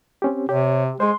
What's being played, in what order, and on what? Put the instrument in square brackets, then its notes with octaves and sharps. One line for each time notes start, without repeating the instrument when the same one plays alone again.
[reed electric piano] C4 C#4 G4
[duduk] C3 [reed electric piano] G4 [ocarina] C#5
[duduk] G#3 [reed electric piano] G#4 C5 [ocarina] C6